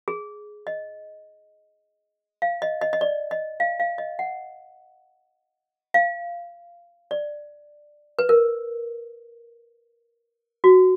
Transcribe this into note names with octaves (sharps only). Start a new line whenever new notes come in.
G#4
D#5
F5
D#5
D#5
D#5
D5
D#5
F5
F5
D#5
F#5
F5
D5
B4
A#4
F#4